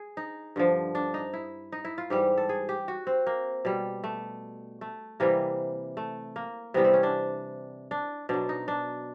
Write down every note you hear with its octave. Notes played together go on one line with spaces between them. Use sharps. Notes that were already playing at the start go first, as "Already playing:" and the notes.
Already playing: G#4
D#4
G2 D3 F3
D4
D#4
E4
D#4
E4
F4
G#2 E3 G3 G4
A4
G#4
G4
F#4
C4
A#3
B2 G3
A3
A3
C3 E3 G3 A#3
A3
A#3
C3 E3 G3 B3
C4
C#4
D4
D4
B2 F#3 D4
D#4
D4